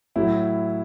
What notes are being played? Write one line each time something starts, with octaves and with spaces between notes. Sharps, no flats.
A2 F#3 E4